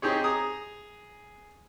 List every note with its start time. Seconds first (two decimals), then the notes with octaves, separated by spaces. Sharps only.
0.02 C4 D#4 G4 G#4 C#5
0.24 G#4 A#5 D#6